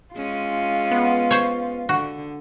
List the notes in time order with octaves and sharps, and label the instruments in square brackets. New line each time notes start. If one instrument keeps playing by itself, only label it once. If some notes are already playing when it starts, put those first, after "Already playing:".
[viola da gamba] G#3 C#4 [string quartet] F4
[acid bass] B3
[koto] C5 C#5
[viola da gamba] D3 [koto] F#4